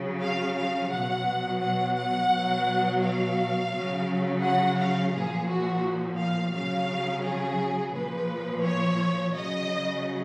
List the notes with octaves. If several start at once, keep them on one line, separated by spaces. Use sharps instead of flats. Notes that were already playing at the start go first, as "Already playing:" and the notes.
Already playing: C#3 F#3
F5
F5
B2 F#3 F#5
F#5
F#5
B2 F#3
F5
C#3 F#3
F#5
F5
A#2 F3 G#4
F#4
F5
C#3 F#3 F5
G#4
A#2 F3 B4
C#5
C#3 F#3 D#5